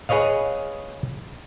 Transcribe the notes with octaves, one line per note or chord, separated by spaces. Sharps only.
G#4 B4 C#5 D#5 F5